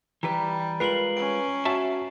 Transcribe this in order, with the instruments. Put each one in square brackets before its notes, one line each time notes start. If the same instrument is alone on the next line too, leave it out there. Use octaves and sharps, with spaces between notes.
[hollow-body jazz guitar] E3 G4 B4 [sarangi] G3 [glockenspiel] A#5
[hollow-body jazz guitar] G#3 F4 A#4 [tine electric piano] B4 [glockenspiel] C7 F#7
[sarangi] C#4 [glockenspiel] D7
[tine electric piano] F#4 [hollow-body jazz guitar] E5 A5